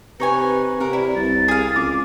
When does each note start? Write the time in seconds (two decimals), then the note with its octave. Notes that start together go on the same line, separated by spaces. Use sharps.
0.20 C3 D#4 B4 C#5 G#5
0.80 C3 A#4 F#5
0.93 E4 D5
1.16 C2 A6
1.48 G#4 F5
1.76 C#2 D6